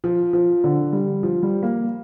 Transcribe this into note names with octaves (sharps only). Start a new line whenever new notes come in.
F3
F3
D3
G3
F3
G3
A#3